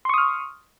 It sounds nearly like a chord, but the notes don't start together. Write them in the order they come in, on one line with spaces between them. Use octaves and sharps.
C6 C#6 D#6 F6